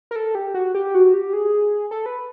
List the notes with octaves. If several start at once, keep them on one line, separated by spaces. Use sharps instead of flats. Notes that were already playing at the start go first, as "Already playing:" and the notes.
A#4
A4
G4
F#4
G4
F#4
G4
G#4
A4
B4